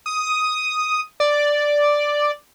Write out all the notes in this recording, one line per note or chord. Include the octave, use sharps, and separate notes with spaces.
D#6
D5